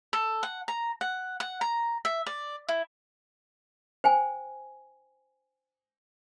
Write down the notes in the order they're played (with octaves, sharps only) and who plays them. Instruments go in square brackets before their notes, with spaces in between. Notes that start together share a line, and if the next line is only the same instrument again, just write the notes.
[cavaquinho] A4
F#5
A#5
F#5
F#5
A#5
E5
D5
E4
[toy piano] C5 G5 G#5